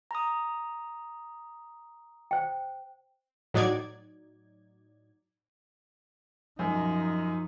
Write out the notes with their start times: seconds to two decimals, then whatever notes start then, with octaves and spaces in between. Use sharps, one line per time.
0.11 A#5 D#6
2.31 C5 G5
3.54 A2 F#3 D#4 D5 G#6
6.59 F#2 F3 D#4